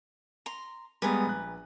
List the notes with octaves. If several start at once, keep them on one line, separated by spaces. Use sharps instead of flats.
A#5 C6
G3 G#3 B3 B4 G#5 A#5
A#1 F#6